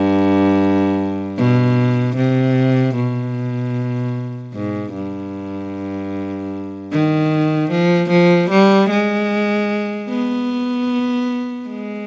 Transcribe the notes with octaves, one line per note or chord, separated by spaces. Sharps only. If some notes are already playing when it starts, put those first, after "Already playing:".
Already playing: G2
B2
C3
B2
G#2
G2
D#3
F3
F3
G3
G#3
B3
G#3